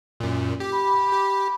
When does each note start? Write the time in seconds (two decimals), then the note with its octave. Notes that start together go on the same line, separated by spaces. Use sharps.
0.20 F#2 A#2
0.60 G4
0.72 B5
1.13 G4